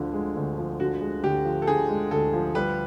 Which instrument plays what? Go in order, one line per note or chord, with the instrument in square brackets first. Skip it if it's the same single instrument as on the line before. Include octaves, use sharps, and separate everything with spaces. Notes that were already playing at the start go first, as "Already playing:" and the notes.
Already playing: [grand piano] D2 D3 F3
G#3
D2
F3
[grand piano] D3 [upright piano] F#4
[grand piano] G#3
[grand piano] D2 [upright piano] G4
[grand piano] F3
[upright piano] A4
[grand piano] D3 [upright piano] G#4
[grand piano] G#3
[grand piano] D2 [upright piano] A4
[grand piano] F3
[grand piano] G3 [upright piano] B4